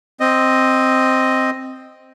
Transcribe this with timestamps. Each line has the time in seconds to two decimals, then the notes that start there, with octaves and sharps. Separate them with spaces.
0.20 C4 D#5